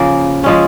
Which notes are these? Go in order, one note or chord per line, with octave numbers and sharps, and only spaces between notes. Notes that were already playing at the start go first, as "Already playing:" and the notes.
Already playing: C#3 F3 A#3
F3 G#3 C#4